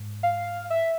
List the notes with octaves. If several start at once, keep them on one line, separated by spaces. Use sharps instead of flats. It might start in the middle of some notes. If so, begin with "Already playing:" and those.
Already playing: G#2
F5
E5